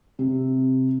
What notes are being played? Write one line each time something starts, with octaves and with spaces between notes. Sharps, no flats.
C3